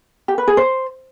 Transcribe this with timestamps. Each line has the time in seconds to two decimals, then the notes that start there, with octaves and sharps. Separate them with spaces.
0.28 G4
0.38 B4
0.48 G#4
0.57 C5